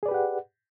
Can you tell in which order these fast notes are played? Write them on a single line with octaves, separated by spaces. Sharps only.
G#4 D5 B4 G4 F#5